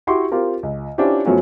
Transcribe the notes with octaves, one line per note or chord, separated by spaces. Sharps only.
E4 F#4 G4 C6 C#6
C4 F4 G4 A#4
C#2
C#4 D4 E4 F4 G4 C5
F#2 F3 F#3 A3 B3 C#4